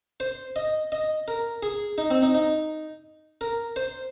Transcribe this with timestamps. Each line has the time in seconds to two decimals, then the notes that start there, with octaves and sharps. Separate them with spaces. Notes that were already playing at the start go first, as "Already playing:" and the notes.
0.20 C5
0.56 D#5
0.92 D#5
1.28 A#4
1.63 G#4
1.98 D#4
2.11 C4
2.23 D#4
2.34 D#4
3.41 A#4
3.76 C5